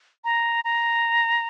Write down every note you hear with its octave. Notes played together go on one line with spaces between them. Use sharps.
A#5
A#5